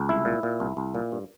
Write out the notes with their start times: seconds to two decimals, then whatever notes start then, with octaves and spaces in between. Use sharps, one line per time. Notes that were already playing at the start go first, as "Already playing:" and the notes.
Already playing: C#2
0.09 C2 E4
0.25 A#2
0.43 A#2
0.60 C2
0.77 C2
0.95 A#2
1.12 G2